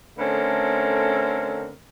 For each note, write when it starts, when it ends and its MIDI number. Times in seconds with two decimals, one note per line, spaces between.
0.19 1.72 50
0.19 1.72 57
0.19 1.72 60
0.19 1.72 61
0.19 1.72 69
0.19 1.72 70